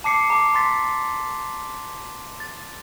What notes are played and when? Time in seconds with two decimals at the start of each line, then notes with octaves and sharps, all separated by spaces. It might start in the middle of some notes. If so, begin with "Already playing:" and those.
0.04 A5 D6 C7 C#7
0.30 A#5 D6
0.55 C6 A6 B6
2.40 A6